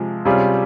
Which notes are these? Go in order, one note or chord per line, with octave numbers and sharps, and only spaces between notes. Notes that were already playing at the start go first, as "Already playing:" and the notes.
Already playing: C3 F3 G#3
C3 G3 C#4 F4 G#4